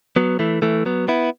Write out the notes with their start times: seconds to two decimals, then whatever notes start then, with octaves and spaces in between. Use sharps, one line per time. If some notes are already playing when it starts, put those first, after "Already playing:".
0.16 F#3 B3
0.39 E3 A3
0.62 E3 A3
0.86 F#3 B3
1.08 B3 E4